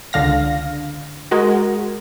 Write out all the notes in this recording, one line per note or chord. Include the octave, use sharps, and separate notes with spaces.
C#2 D3 F5 A#6
G#3 F#4 A#4